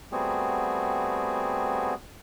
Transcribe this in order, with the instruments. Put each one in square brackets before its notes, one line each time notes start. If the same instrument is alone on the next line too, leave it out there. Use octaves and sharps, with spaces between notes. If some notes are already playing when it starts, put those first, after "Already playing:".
[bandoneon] G3 A3 B3 C4 F#4 G#4